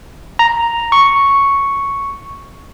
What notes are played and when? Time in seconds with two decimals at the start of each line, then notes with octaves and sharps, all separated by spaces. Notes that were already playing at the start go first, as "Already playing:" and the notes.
0.39 A#5
0.92 C#6